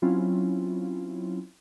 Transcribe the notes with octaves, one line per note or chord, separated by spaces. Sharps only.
F#3 C4 C#4 E4 F4